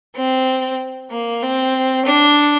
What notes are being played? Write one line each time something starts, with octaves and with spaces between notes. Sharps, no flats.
C4
A#3
C4
D4